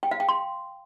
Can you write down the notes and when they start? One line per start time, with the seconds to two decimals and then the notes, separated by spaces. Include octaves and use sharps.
0.03 G5
0.11 F5
0.20 G5
0.29 C6